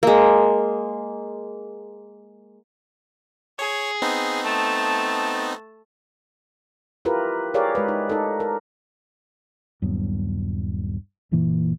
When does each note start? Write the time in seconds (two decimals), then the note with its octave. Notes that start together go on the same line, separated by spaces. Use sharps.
0.03 G#3 A#3
3.59 G#4 C#5
4.02 B3 C4 D#4
4.44 A3 A5
7.05 E4 F4 G4 A#4 B4
7.54 G4 G#4 A#4 C#5 D5 F5
7.75 G#3 B4
7.88 D#4
8.10 D#4 A4
8.40 A#4
9.82 D#1 G2 F#3 B3
11.32 F#1 A#2 E3 A#3